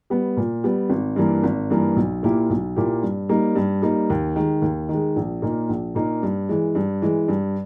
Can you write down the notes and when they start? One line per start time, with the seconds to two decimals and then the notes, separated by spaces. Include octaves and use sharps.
0.10 G3 B3
0.37 A#2
0.64 G3 B3
0.90 G#1
1.16 G2 E3 A#3
1.43 G#1
1.70 G2 E3 A#3
1.96 B1
2.23 A#2 A#3 E4 G4
2.50 B1
2.76 A#2 A#3 E4 G4
3.03 G2
3.29 G3 A#3 D#4
3.55 G2
3.82 G3 A#3 D#4
4.10 D#2
4.36 D#3 G#3
4.62 D#2
4.89 D#3
4.94 G#3
5.16 A#1
5.42 A#2 A#3 D#4
5.69 A#1
5.95 A#2 A#3 D#4
6.23 G2
6.49 E3 G#3
6.75 G2
7.02 E3 G#3
7.28 G2